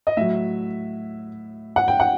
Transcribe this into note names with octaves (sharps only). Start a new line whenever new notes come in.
D#5
A2 F#3 E5
F#5
G5
F#5